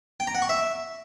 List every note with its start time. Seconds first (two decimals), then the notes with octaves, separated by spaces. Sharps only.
0.20 G5
0.27 A#5
0.35 F#5
0.42 C#6
0.49 E5